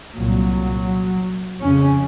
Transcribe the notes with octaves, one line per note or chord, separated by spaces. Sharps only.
C2 A#2 F#3
F2 C#3 C#4